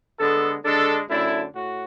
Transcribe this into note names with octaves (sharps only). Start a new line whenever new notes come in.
D3 G#3 B3 A4
D3 G#3 D4 A4
F#2 D3 A3 D4 E4
A2 F#4